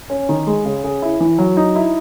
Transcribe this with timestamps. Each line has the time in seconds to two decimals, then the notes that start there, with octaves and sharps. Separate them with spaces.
0.10 C#4
0.29 D#3
0.47 G#3
0.65 C#3
0.84 C#3
1.02 E4
1.20 E3
1.38 F#3
1.57 D#4
1.76 E4